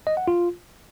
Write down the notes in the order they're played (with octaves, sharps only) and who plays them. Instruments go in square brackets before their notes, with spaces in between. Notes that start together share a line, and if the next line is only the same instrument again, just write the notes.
[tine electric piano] D#5
F#5
F4